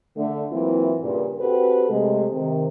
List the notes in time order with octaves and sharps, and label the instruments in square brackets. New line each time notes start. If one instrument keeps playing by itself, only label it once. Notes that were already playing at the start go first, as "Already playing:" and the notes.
[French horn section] D3 A3
E3 F#3 A#3 C4 E4 F4
G2 A#2 C#3
C4 F#4 G4 A4 B4
C3 G#3 A3
C3 D#3